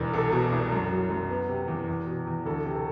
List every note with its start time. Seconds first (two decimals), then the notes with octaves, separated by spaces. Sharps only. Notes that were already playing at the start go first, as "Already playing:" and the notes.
Already playing: E1 E2
0.13 C2 A4
0.32 B2
0.52 C2
0.72 F#2
0.91 F#3
1.10 F#2
1.30 B3
1.49 C3
1.68 E2
1.88 E2
2.07 B2
2.27 E2
2.45 D2 A4
2.65 C3
2.75 A4